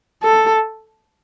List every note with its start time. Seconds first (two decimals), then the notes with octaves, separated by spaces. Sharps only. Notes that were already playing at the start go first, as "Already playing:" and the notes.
0.23 A4